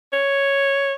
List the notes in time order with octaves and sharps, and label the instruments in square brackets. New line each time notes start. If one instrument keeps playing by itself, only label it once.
[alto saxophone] C#5